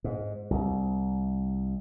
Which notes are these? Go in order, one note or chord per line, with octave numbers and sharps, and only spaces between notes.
G#2
C2